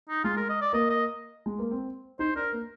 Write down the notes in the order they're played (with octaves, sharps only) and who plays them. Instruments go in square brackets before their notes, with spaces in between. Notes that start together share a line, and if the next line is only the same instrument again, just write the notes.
[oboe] D#4
[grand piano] G#3 [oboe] F4
[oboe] A#4
D#5
D5
[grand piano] A#3 [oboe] D#5
[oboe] D#5
[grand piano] G#3
A#3
C4
[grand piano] D#4 [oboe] C5
[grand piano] D4 [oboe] A#4
[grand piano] A#3